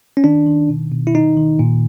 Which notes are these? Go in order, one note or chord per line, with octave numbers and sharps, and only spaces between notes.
C#4
D#3 D4
D#3
B2
B2
E4
D#3 D#4
D#3
A#2